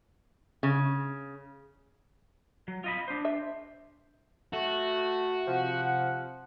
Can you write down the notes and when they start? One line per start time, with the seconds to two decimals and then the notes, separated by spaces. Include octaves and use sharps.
0.63 C#3
2.68 F#3
2.84 F4 D#5 B5
3.08 D4 C5
3.25 E5
4.53 A3 F#4
5.47 C3 F3 F#5